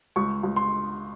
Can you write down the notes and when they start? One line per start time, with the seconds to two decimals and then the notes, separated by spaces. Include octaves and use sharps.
0.16 C#2 C#6
0.43 C#2
0.56 C6